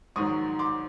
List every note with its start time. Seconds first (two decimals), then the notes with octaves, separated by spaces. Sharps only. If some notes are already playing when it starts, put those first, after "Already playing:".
0.16 A#1 G#2 D#3 F#3 C#6 D#6
0.59 C6 D6